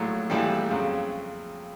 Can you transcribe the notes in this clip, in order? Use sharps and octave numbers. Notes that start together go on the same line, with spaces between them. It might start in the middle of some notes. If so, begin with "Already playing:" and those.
Already playing: A#1 A2 F#3
A#1 A2 E3 G3
F2 C#3 F#3